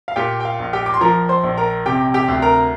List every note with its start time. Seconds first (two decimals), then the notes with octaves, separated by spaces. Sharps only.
0.08 F5
0.16 A#2 G4 G5
0.40 G5
0.45 F5
0.59 A#1
0.73 G4 G5
0.86 D6
0.94 C6
1.01 F3 A#4 A#5
1.29 C5 C6
1.44 A#1
1.57 A#4 A#5
1.86 C3 G4 G5
2.14 G4 G5
2.28 D2
2.42 A#4 A#5